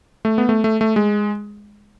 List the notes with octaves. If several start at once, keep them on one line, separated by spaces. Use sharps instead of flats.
A3
B3
A3
A3
A3
G#3